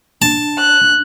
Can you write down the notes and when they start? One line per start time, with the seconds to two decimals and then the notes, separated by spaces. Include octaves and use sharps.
0.22 D4 A5
0.60 F#6